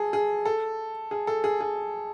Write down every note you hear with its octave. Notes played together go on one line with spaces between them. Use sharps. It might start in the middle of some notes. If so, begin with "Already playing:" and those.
Already playing: G#4 A4
G#4
A4
G#4
A4
G#4
G#4